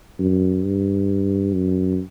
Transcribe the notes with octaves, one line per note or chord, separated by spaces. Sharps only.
F#2
G2
F#2